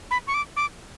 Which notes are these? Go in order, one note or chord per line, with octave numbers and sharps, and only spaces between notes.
B5
C#6
D6
D6